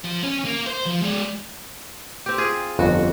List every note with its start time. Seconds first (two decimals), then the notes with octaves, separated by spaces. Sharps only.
0.04 F3
0.23 C#4
0.45 A#3
0.67 C5
0.86 F3
1.02 G#3 D5
2.26 C4 G4
2.38 F4 G#4
2.79 G1 F2 F#4